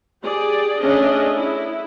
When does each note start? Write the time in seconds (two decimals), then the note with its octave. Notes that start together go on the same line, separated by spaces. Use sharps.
0.23 G4 G#4 D5
0.80 A3 C#4 D4 G#4 D#5 E5
1.36 E4